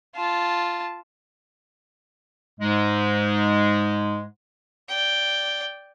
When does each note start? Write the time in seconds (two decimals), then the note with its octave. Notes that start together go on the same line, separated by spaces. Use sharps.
0.16 F4 A5
2.60 G#2 G#3
4.89 D5 G5